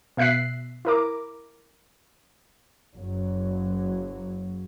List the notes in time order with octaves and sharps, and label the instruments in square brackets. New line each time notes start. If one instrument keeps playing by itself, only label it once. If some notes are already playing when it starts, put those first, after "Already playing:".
[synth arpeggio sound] B2 E5 F#6 B6 C7
E4 A#4 D6
[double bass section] F#1 F#3